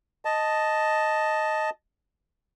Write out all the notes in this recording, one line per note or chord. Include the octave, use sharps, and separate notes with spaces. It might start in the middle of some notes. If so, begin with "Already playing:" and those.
D#5 A5